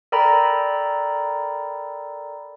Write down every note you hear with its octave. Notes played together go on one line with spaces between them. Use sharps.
A4 A#4 D5 G5 A#5 B5